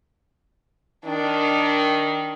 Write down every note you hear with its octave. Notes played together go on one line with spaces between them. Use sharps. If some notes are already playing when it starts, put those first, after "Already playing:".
D#3 D4